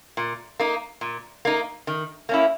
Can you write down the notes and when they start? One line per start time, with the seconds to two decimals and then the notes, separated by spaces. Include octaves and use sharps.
0.17 A#2
0.60 A#3 D#4
1.01 A#2
1.45 A#3 D#4
1.87 D#3
2.29 A#3 C#4 E4